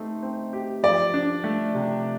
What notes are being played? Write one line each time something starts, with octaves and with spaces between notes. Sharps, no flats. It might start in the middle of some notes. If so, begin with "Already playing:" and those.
Already playing: A3 C4 D#4 G4
C4
G4
F3 D5
D4
A3
C3